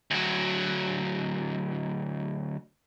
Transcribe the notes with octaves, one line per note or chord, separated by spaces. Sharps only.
D2 F#3